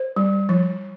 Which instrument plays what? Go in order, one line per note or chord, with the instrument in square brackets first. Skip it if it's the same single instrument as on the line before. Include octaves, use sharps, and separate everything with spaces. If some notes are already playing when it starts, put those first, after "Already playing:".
Already playing: [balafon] C5
G3
F3